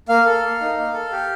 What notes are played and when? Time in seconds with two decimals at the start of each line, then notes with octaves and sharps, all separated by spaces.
0.09 A#3 F5
0.26 A4
0.43 A#3
0.61 D#4
0.77 A#3
0.94 A4
1.12 G4